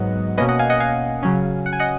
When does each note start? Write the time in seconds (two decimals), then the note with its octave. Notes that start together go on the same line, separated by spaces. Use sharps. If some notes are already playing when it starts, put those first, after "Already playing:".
Already playing: G#2 F#3 B3 D#5 F#5
0.37 B2 A#3 C#4 B4 D#5
0.49 D#5 F#5
0.59 F5 G#5
0.70 D#5 F#5
0.80 F5 G#5
1.23 C#3 F#3 C#4
1.66 F#5
1.73 G#5
1.80 D#5 F#5